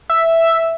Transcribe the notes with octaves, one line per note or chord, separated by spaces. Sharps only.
E5